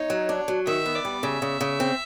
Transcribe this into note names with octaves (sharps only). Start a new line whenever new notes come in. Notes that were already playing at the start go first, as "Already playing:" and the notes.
Already playing: D#4 C#5
F#3
D4
F#3
D#3 E5
B3
D5
G3
C#3 E5
C#3
C#3
C4